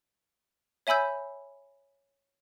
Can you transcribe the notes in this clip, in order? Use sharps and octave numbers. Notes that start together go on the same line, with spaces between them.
C#5 E5 G#5 B5 E6 G6